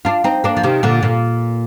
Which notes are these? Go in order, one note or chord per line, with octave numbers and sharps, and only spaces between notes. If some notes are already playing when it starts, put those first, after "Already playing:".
D4 F4
C4 D#4
A#3 D4
F3
C3 D#3
A#2 D3
A#2